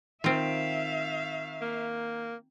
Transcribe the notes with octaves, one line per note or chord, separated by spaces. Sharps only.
D#3 C4 F4 E5 F5 D7
A#3